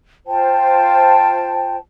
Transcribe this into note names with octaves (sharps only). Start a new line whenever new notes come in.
F4 C5 G5 A5